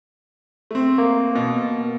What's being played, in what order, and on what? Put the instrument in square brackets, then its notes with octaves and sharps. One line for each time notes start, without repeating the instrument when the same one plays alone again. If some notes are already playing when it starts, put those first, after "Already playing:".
[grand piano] A3 C4
[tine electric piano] A#3
[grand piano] B2